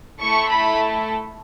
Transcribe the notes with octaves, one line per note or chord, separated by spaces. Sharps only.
A3 E4 A4 C#6
B5